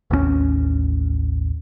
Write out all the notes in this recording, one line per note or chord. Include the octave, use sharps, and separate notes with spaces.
A1 D#2 G#3 C#4